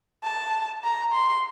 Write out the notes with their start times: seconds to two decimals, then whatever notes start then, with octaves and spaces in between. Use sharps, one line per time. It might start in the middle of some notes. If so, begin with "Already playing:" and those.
0.24 A5
0.83 A#5
1.12 C6